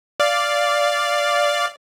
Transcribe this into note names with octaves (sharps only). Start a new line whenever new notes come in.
D5 F5